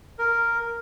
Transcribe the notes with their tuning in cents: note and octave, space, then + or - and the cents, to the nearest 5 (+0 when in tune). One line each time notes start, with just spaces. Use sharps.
A#4 -5